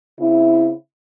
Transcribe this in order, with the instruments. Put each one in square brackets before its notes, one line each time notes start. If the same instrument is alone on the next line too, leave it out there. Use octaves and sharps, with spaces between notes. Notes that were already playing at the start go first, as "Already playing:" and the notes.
[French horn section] C#3 C4 E4